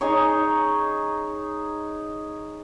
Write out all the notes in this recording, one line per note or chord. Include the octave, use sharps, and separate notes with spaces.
D#4 G#4 C#5